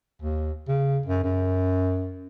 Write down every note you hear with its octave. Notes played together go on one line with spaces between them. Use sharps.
D#2
C#3
F#2
F#2